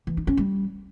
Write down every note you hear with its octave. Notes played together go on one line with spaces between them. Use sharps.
E3
D#4
C#4
G3